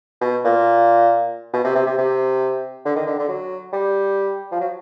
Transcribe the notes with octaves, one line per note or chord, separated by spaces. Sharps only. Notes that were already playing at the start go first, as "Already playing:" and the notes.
B2
A#2
B2
C3
C3
C3
C3
D3
D#3
D3
D3
F#3
G3
F3
F#3